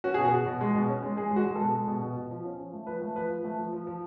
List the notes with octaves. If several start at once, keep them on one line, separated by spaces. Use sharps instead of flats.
C#4 F#4
B2 G#4
F#4
B2
B2
G#3
B2
C#4
G#3
G#3 G#4
G#3
F#4
G#3
B2 A4
G#3
B2
B2
B2
F3
C#4
F3
A3
F3 B4
A3
F3 B4
F3
A3
F3
F3
F3